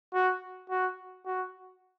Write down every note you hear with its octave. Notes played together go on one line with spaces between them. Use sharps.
F#4
F#4
F#4